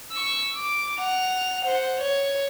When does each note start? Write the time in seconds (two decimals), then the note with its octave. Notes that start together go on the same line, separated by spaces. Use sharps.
0.12 C#6 E6
0.56 D6
1.00 F#5 F7
1.65 C5 F#5
1.99 C#5